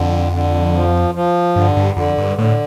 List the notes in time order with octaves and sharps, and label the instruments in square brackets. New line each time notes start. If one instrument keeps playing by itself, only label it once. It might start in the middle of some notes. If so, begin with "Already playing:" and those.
Already playing: [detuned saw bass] F2 [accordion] D3
[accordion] D3
F3
F3
[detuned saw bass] G2 [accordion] D3
[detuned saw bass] G2
[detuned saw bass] F2 [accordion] D3
[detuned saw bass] G2
[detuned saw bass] A2 [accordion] D3